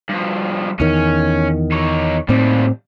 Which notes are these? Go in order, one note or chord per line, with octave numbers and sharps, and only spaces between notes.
G2 F3
E2 D#3 C#4
D#4 C#5
D#2 A2 G3 C4